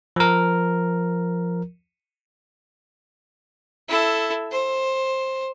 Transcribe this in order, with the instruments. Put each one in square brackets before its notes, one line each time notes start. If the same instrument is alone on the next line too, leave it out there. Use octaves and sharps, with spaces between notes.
[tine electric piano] F3 A#4
[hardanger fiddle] E4 A4
C5